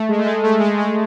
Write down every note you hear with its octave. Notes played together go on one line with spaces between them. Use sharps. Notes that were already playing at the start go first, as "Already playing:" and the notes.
Already playing: A3
G#3
A3
G#3
A3
G#3
G#3